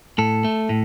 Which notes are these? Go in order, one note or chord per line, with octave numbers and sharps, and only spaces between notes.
A2 A4
A3
A2